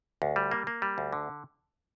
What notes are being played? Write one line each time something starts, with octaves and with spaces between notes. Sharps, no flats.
D2
G3
A#3
A#3
G3
D2
D3